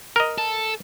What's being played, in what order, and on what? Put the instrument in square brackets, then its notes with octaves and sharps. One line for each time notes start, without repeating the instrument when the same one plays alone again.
[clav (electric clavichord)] A#4 D#5
[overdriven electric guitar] A4